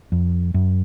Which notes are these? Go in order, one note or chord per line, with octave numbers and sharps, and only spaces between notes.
F2
F#2